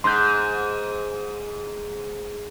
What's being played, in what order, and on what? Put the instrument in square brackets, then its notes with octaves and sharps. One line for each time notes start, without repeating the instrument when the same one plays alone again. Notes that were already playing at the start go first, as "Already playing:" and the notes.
[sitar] G#2 [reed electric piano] C6 G6